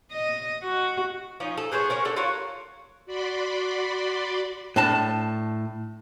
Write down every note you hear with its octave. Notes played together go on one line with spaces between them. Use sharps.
D#5
F#4
F3 C#4 D#4
A4
B3 G#4 C5 C#5
C#4 A#4 C#5 F#5
D4 A4
F4 F#4 A#4 C#5
F#4 D5 B5 C6 D6
A2 D4 A5